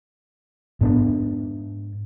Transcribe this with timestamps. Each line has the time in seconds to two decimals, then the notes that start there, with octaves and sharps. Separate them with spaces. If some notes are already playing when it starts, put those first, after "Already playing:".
0.81 G#2 B3 D4